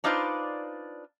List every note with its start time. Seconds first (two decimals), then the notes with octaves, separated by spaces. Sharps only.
0.04 D4 D#4 F4 B4 C5 D5